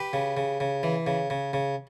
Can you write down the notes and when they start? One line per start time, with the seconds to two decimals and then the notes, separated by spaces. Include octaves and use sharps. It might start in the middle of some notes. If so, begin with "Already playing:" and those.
Already playing: G4 B4
0.13 C#3
0.37 C#3
0.60 C#3
0.83 E3
1.07 C#3
1.30 C#3
1.53 C#3